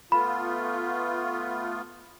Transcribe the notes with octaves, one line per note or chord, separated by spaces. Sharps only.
A3 B3 F4 B5